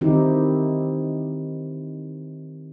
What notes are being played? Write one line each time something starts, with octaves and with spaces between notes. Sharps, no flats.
D#3 C4 D#4 E4 G4